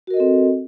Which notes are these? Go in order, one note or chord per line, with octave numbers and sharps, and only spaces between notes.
C4 F#4 A4 A#4 D#5